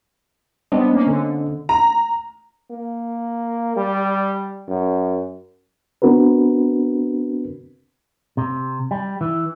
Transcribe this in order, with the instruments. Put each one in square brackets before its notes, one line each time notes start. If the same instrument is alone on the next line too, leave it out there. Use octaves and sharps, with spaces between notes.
[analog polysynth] G3 B3 [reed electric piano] C4 D4 D#5
[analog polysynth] A#3 C#4
D3
[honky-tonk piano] A#5
[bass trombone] A#3
G3
F#2
[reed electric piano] B3 C4 D4 F#4 A#4 B4
[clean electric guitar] C3
G3
E3